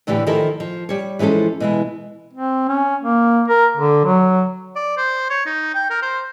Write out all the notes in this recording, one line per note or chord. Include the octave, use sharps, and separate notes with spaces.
A2 D3 E3 A3 G4
D#3 F3 E4 A4 A#4
F3
G3 C#5
E3 F3 G#3 C#4 A4
B2 E3 G#3
C4
C#4
A#3
A#4
D3
F#3
D5
C5
C#5
D#4
G5
A#4
C5